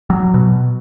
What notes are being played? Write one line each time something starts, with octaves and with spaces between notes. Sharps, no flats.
F#3
B2